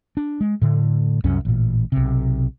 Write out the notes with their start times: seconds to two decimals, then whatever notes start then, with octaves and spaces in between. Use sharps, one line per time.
0.17 D4
0.41 G#3
0.62 A2 D3
1.24 C2 F#2 C#4
1.45 A1 A#2
1.92 B1 C3